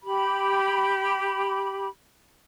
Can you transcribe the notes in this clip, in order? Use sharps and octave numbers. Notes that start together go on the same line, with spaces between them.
G4 B5